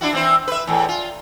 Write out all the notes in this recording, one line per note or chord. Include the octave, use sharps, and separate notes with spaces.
D4 E4 F#4
E3 C4 E4
B4 E5
E2 A2
F4